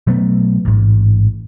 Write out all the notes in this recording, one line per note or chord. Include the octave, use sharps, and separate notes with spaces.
B2 F#3 A3 B3
A1 G#2